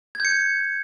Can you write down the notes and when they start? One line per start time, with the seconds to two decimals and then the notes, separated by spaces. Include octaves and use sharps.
0.15 G#6
0.20 G6
0.25 C#7